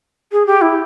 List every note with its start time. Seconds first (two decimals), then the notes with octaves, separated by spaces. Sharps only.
0.32 G#4
0.46 G4
0.61 E4